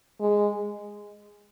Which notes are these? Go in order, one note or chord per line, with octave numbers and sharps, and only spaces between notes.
G#3